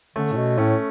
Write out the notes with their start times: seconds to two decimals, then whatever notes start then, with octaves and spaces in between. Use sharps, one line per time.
0.16 D3 A3 C#4
0.33 A2
0.37 B2
0.57 A2 A3 C#4